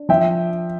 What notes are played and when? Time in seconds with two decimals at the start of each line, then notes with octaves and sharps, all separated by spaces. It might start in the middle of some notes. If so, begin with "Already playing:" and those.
Already playing: D4
0.09 F3 E5 G5